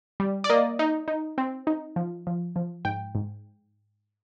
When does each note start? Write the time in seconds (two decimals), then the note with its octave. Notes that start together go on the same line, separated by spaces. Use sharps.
0.20 G3
0.44 D5
0.50 A#3 D#5
0.79 D#4
1.08 D#4
1.38 C4
1.67 D#4
1.96 F3
2.27 F3
2.56 F3
2.85 G#2 G5
3.15 G#2